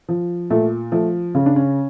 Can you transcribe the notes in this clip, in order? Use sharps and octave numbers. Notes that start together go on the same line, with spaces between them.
F3
A#2 A3
F3 A3
C#3 C#4
D4
C#4